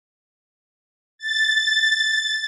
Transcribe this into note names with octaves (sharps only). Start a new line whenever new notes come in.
A6